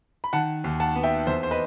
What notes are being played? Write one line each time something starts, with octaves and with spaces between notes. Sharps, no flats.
B5
D#3 F#5 A5
D#2
F#5 A5
B3
E5 G5
E2 C5 E5
C5
B4 D#5